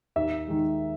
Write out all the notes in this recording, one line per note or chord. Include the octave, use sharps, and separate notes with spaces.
D#2 E5
D#3 G#3